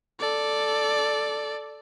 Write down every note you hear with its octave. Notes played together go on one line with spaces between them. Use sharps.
A4 D5